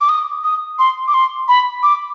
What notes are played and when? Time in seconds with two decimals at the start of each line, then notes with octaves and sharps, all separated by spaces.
0.01 D6
0.09 D#6
0.44 D#6
0.79 C6
1.08 D6
1.14 C6
1.48 B5
1.83 D6